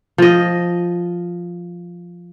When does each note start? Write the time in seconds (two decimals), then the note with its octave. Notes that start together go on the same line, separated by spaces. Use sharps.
0.18 F3 D#5